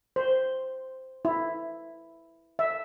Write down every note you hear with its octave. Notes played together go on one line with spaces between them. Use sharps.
C5
E4
E5